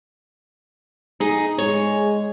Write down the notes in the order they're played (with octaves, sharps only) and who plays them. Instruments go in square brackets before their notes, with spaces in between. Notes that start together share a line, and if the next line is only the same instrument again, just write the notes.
[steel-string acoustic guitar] D#4 G#4
[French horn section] G#3 [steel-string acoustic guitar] C#5